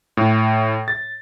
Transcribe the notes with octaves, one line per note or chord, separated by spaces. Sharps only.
A2
A6